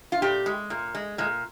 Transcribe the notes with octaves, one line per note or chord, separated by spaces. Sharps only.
F4
A#2 G4
G#3
A#2
G#3
A#2 G#3